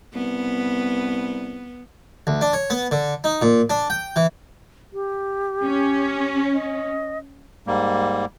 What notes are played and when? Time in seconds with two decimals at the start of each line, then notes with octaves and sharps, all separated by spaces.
0.14 C2 B3
2.27 D2
2.41 D4
2.53 C#5
2.70 B3
2.91 D3
3.24 D#4
3.42 A#2
3.70 D4
3.90 G5
4.16 E3
4.93 G4
5.66 C#4
6.54 D#5
7.67 G#2 G3 A#3